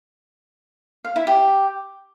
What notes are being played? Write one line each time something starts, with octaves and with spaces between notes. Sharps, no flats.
F5
E4
G4